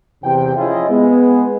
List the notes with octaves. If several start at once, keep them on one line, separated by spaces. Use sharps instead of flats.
E2 C3 G5
F3 C#4 E4 F4 G#4 D#5
G#3 B3